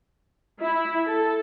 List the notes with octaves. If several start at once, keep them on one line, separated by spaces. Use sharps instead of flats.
E4
A4